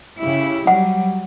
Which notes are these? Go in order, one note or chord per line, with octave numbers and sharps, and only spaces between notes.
C#3 E4 G4
F#3 G3 F#5